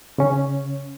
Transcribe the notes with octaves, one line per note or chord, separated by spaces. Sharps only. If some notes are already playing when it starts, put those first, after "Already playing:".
C#3 C#4